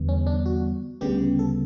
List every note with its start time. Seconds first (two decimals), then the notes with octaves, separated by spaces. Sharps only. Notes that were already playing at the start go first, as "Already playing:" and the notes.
Already playing: E2 D3 G3 B3
0.09 C#4
0.27 D4
0.46 F#4
1.01 D2 C#3 G3 B3 G4
1.39 A4